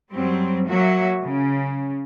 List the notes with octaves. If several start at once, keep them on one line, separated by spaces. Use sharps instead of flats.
F#2 F#3 G3 C4
F#3 A#3 F#4 E5
C#3